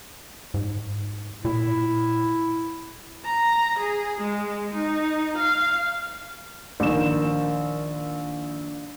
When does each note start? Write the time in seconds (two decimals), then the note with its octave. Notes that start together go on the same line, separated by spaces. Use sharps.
0.54 G#2
1.45 A#2 E4
3.25 A#5
3.78 G#4
4.20 G#3
4.74 D#4
5.37 F5
6.80 A#1 D#3 E7